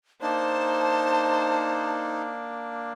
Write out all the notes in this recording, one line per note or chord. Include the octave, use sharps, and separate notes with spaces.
A#3 D4 D#4 C5 A5